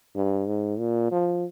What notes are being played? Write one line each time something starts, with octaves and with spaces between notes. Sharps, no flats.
G2
G#2
A#2
F3